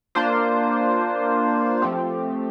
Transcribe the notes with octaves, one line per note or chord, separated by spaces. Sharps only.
A#3 D4 F4 C5
F3 A3 C4 G4